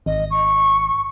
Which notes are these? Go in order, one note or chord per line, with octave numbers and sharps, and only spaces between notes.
G#1 D#5
C#6